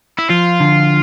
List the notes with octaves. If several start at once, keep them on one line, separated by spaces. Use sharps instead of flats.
E4
F3 F4
D3